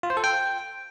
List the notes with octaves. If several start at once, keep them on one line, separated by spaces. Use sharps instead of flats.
F4
C5
A4
G5